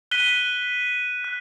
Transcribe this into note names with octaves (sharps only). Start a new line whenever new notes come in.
F#6 B6 D#7 G7
F#6